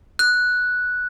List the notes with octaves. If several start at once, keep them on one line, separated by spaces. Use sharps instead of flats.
F#6